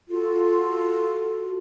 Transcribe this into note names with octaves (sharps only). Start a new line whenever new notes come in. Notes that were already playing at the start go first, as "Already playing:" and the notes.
F4 F#4 A4